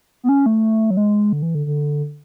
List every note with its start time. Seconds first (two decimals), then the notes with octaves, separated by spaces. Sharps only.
0.24 B3
0.29 C#4
0.46 A3
0.90 F#3
0.97 G#3
1.33 D3
1.42 E3
1.55 D3
1.66 D3